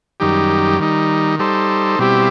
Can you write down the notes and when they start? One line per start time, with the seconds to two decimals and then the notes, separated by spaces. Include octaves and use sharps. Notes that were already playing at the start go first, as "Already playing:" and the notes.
0.20 F#2 D#3 G3 D#4 G4
0.79 D#3 G3 D#4
1.39 G3 D#4 A4 C5
1.99 B2 G3 C4 E4 G4